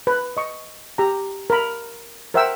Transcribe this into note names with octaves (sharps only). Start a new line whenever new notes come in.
B4
D#5 C#6
G4 A#5
A#4 B5
A#4 C5 E5 F#5 G5 E6